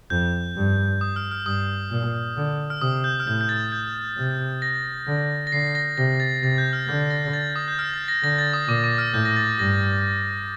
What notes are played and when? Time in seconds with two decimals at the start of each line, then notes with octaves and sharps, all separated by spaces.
0.10 F2 G6
0.56 G2
1.01 D#6
1.16 F6
1.31 F6
1.46 G2 D#6
1.91 A#2
2.37 D3
2.70 F6
2.81 C3 D#6
3.04 G6
3.20 F6
3.26 A2 G6
3.41 G6
3.49 A6
3.72 G6
4.17 C3
4.62 A#6
5.08 D3
5.47 A#6
5.52 D3 C7
5.75 A#6
5.97 C3 A#6
6.20 A6
6.43 C3 A6
6.58 G6
6.73 F6
6.88 D3 G6
7.10 A#6
7.33 A6
7.56 D#6
7.68 G6
7.79 F6
7.94 A6
8.08 A#6
8.23 D3 A#6
8.38 A6
8.53 D#6
8.68 A#2 D6
8.84 D6
8.98 F6
9.14 A2 G6
9.25 A#6
9.37 A6
9.59 G2 A#6